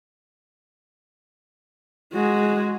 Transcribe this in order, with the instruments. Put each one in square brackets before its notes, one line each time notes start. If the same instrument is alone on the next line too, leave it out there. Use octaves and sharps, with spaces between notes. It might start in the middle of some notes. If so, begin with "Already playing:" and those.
[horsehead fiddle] G#3 F#4